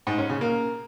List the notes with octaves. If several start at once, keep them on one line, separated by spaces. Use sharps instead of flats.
G#2
C#4
C#3
A#3